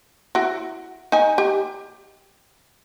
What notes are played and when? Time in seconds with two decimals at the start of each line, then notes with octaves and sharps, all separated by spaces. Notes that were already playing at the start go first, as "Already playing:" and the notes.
0.35 E4 F#4
1.12 D#4 G#5
1.38 G4